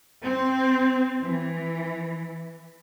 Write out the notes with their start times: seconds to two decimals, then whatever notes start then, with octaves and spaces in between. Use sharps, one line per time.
0.21 C4
1.22 E3